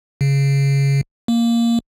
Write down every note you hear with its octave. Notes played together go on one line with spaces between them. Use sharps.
C#3
A#3